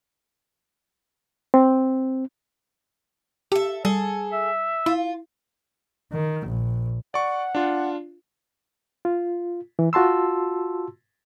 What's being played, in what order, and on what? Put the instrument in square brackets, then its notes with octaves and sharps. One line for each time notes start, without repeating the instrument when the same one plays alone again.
[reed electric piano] C4
[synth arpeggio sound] G4 [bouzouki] A4 E5
[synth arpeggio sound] G3 [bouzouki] G#4 A4
[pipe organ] E5
[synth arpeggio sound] E4 [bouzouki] F4
[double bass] D#3
A#1
[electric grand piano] D5 C#6 [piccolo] F#5
[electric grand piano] D4 F4
[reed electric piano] F4
E3
F4 F#4 A5 C6 E6